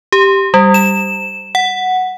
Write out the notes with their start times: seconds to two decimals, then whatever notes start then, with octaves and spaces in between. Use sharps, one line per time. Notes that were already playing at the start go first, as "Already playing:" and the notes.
0.12 G4
0.54 G3
0.74 E7
1.55 F#5